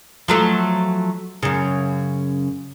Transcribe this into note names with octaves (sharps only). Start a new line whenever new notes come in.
F3 F#3 A3
F#2 C#3